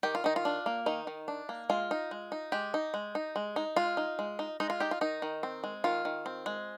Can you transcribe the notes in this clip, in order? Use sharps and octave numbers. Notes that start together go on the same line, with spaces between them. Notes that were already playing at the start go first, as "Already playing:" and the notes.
D#3 G4
F4
D#3 D#4
F4
D4
A#3
D#3 D#4
D#3
D4
A#3
G#3 F4
D#4
G#3
D#4
G#3 G4
D#4
G#3
D#4
G#3
D#4
G#3 F4
D#4
G#3
D#4
G#3 D#4
F4
D#4 G4
F4
D#3 D#4
D#3
C4
G#3
D#3 F4
D#3
C4
G#3